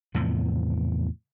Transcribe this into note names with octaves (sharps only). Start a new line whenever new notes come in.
E2 A2 C3 F3